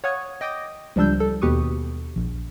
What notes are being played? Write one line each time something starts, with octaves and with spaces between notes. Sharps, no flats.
C#5 F5 F#5 C#6 D#6 G#6
D#5 G5 D6 D#6 A#6
C#2 F3 G3 D4 E6 G6
A4
D#2 B2 G4 B4 C#6 D#6
A#1